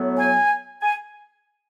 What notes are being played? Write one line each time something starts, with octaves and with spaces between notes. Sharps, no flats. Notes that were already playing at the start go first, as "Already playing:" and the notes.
Already playing: A2 F#3 B3
G#5
G#5